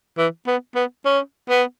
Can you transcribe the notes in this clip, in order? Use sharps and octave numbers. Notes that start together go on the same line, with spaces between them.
E3
B3
B3
C#4
B3